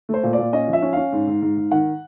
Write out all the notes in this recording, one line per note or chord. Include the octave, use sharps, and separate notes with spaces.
A3 C5
A#2
D5
A#2
C#4 D#5
F3
E5
C#4
C#4 F5
G#2
G#2
G#2
G#2
D#3 F#5